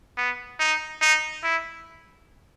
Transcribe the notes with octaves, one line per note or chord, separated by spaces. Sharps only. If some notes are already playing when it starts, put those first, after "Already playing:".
B3
D#4
D#4
E4